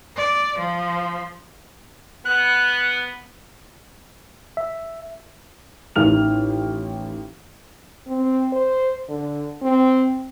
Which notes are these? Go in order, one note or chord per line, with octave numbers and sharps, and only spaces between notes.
D5
F3
B3 F#6
E5
A1 D#3 F6 F7
C4
C5
D3
C4